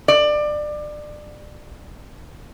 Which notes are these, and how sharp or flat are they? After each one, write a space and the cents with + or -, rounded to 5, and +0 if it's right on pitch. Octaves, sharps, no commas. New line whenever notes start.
D5 +25